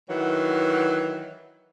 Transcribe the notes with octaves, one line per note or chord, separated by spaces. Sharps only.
D#3 E3 F#3 F#4